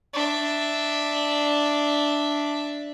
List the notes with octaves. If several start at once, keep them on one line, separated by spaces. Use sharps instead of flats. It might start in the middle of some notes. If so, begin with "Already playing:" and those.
D4 E5